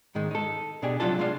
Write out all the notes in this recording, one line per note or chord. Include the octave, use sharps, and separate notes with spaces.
G#2 D#3 G#3
D#4 A4
B2 D4 G4 G#4
C3 F#3 G3 D4 F4 A4
G#3 D4 F4 F5